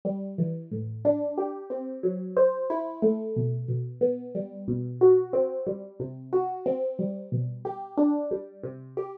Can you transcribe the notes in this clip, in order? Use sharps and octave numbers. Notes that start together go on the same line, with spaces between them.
G3
E3
A2
D4
G4
C4
F#3
C5
E4
A3
B2
B2
B3
G3
B2
F#4
C4
G3
C3
F#4
C4
G3
B2
G4
D4
G3
C3
G4